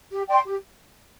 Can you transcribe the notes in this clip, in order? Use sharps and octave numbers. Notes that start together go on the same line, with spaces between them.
G4
D5 G5 C6
G4